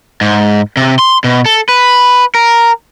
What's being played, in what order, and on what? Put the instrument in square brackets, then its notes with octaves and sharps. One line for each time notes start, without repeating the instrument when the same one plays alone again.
[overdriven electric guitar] G#2
C3
C6
B2
A4
B4
A#4